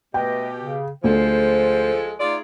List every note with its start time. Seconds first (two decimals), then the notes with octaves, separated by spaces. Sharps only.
0.14 B2 A3 G4 B4 D#5 G5
0.62 C#3
1.04 D2 F3 G#3 A4 C5
2.19 A3 D#4 F4 G#4 D5